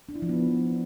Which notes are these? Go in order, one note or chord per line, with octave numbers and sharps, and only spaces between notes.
D4
E4
F3
B3